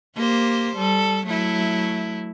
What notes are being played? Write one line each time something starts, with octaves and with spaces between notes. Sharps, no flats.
A#3 G4 C5
G3 A4
F#3 A3 E4